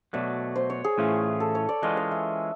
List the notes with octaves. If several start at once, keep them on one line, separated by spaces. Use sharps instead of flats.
B2 F#3 A3 D5
C5
C#5
G#4
A2 E3 A3 C#4 F4
A4
C#5
D5
E3 G#3 C#4 F4 D#5
D#5
E5